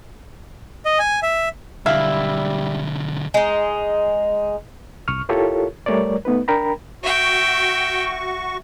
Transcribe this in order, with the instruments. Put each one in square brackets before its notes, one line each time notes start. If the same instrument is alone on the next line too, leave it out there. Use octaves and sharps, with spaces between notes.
[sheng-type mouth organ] D#5
G#5
E5
[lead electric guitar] B1 D3 [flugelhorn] G3 [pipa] E4 [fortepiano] E5 F5
[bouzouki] G#3 D#4
[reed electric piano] C2 C#6 F6
E4 F4 G4 A4 A#4 C#5
G3 A3 A#4 C#5 D5
A3 B3 D#4 B4
D4 A#4 G5 A#5 B5
[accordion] F#4 C#6 [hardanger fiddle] E5 G5